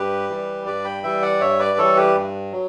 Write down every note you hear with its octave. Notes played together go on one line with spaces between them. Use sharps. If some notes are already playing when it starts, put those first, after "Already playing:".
Already playing: G2 G4 B4
E3 G3
G2 B4 D5
G5 B5
E3 G3 E5 G5
D5 F#5
G2 C#5 E5
B4 D5
E3 G3 A4 C#5
G4 B4
G2
F#3